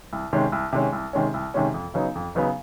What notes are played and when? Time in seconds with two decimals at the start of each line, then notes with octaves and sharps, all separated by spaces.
0.13 C2
0.33 C3 D#3 G#3 C#4
0.52 C2
0.73 C3 D#3 G#3 C#4
0.93 C2
1.13 C3 D#3 G#3 C#4
1.34 C2
1.54 C3 D#3 G#3 C#4
1.74 F2
1.94 C#3 F#3 B3 D#4
2.15 F2
2.35 C#3 F#3 B3 D#4